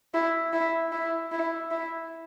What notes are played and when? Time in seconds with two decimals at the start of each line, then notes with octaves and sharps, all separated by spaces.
0.14 E4
0.53 E4
0.92 E4
1.32 E4
1.71 E4